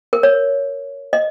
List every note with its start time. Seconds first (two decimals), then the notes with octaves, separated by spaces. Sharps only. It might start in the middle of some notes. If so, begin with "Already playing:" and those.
0.13 A#4
0.23 C#5
1.13 D#5